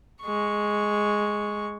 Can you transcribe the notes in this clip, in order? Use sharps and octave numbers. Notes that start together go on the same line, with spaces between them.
G#3 C#6